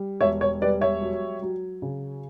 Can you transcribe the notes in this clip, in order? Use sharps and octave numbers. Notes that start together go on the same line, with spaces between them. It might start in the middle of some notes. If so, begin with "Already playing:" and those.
Already playing: G3
E1 C#5 E5
C#5
G3 B4 D5
C#5 E5
F#3
F#3
C#3